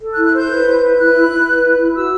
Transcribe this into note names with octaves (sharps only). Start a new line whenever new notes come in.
A4
F#6
E4
F#6
C5 G6
B4
E4
B4
E4 F#6
E4
E4
B4
E4
E4
F#4 E6